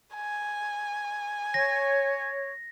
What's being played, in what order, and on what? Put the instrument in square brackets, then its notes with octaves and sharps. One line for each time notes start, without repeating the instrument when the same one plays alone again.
[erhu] G#5
[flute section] C#5 [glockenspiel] A#6